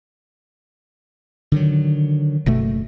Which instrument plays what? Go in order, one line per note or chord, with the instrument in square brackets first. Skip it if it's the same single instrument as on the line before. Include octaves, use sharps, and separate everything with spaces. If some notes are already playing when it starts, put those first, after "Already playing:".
[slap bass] D3 D#3 F#3
[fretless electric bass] F#1 B2 A3